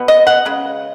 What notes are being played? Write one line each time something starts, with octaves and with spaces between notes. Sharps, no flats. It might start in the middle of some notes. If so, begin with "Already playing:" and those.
Already playing: B2 B3
D#5
F#5
C#3 G#3